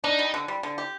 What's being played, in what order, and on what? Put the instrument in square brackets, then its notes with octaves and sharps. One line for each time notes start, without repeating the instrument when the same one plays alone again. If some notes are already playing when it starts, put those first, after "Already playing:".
[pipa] D4 [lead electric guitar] D#4
[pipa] G3
D3
G3
D3
G4